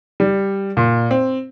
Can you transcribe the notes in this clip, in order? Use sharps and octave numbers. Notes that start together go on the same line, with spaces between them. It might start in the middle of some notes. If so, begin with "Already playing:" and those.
G3
A#2
C4